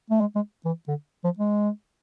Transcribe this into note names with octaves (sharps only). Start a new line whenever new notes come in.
A3
G#3
G#3
E3
D3
F3
G#3